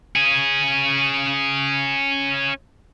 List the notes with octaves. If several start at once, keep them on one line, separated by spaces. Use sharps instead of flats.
C#4 G#4